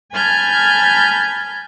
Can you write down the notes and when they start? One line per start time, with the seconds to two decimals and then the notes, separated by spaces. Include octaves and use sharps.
0.13 G#5 A5 B5 F6 G6 G#6